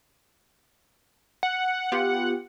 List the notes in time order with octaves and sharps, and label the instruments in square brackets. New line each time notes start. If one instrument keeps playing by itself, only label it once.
[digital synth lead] F#5
[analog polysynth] B3 F4 G4